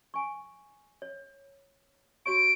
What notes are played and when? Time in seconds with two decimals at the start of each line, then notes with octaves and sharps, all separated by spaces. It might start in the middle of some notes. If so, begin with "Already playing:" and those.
0.14 G#5 C#6
1.02 C#5
2.26 F#4 C#5 C#6 D7